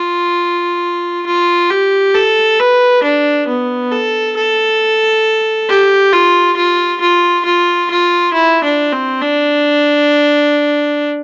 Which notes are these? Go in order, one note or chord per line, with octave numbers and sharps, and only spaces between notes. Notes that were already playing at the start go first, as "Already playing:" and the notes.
Already playing: F4
F4
G4
A4
B4
D4
B3
A4
A4
G4
F4
F4
F4
F4
F4
E4
D4
C4
D4